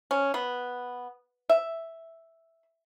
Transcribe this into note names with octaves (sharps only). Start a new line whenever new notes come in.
C#4
B3
E5